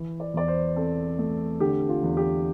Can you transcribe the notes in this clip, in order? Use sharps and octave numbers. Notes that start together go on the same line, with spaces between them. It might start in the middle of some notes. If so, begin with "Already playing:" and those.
Already playing: E3
D5
E2 D5
C5
C4 A4
A3
D3 G4
F4
E2
G4